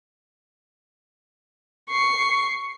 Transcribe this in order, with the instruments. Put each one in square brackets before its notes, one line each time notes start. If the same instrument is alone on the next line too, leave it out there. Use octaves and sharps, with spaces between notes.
[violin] C#6 C7